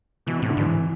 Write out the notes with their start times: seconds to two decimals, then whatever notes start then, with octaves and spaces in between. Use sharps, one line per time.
0.27 B2 E3
0.39 A2 C3
0.49 D3
0.57 G#2 E3